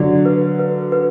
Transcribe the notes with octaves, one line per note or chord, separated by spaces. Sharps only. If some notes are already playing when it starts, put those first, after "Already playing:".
Already playing: D3 F#3 D5
B4
B4
B4